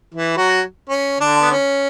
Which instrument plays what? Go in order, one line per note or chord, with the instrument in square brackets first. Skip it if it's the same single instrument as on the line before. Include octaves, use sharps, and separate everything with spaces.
[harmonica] E3 E4
F#3 F#4
C#4
D3 D4
B3
C#4